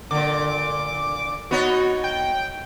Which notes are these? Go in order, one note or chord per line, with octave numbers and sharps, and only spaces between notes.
A#2 D3 D6
B3 D#4 F#4 C#5
G5